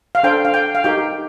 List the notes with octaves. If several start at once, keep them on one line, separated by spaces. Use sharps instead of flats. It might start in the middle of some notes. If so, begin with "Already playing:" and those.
F5
D4 A4 C5 G5
F5
G5
F5
D#4 G4 A#4 G5